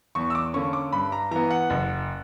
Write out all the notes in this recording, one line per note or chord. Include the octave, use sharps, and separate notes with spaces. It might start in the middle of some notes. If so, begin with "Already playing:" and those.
E2 C#6
E6
D6
D3 A#3 C#4 C#6
D6
G2 B5
A#5
E3 B3 A#5
F#5
F#1